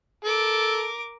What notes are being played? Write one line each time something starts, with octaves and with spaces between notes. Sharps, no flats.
A4 A#4 D6